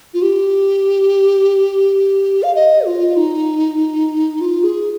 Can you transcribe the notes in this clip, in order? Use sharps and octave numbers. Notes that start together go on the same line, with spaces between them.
F4
G4
F5
D#5
F4
D#4
F4
G#4